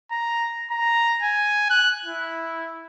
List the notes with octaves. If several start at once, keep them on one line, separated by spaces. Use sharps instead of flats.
A#5
A#5
G#5
F#6
E4